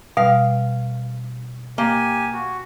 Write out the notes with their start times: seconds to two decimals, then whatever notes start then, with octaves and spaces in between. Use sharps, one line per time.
0.17 B2 G3 F5
1.78 A#3 G4 G#5
2.33 F#4